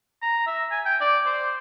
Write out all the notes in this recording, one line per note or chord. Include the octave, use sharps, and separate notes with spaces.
A#5
E5
G#5
G5
D5
C5